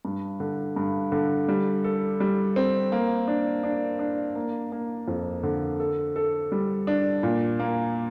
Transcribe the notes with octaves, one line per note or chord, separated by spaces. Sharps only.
G2
D3
G2
D3
G3
A4
G3
C4
A#3
D4
D4
D4
A#3
A#3
F2
D3
A4
A4
G3
D4
A#2
A#3